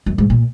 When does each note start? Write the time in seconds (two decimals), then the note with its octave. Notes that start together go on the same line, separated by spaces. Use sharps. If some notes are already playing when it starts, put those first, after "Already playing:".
0.06 F#2
0.18 G#2
0.30 A#2